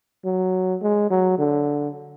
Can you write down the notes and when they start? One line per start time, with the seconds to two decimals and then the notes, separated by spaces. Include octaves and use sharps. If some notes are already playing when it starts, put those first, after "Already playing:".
0.25 F#3
0.82 G#3
1.11 F#3
1.38 D3